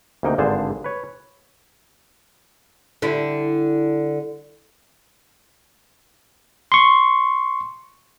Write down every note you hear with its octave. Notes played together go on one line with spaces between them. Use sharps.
D2 C3 A#3 D#4 G5
G#1 G2 D3 G#4 C5 A5
B4 C#5
D3 G3 E4
C6 C#6